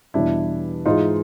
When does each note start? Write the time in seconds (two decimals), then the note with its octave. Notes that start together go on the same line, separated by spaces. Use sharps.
0.14 E2 B2 G3 D4 E4
0.86 G#2 E3 G#3 D#4 F4